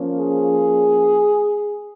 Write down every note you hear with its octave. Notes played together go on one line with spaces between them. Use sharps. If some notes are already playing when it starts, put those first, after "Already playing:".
Already playing: F3 A#3 C#4
G#4